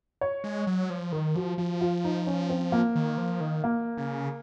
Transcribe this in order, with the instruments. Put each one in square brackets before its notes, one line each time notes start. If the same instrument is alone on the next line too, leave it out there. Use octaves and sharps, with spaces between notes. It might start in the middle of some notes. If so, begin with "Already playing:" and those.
[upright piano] C#5
[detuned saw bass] G#3
F#3
F3
[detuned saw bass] D#3 [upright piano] A#4
[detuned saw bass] F3 [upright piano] F#4
[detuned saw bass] F3 [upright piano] F4
[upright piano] F4
D#4
C#4
C4
A#3
[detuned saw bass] D#3
F3
D#3
[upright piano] A#3
[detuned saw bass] C#3